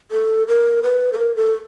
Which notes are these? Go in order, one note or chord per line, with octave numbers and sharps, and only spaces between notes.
A4
A#4
B4
A4
A#4
A4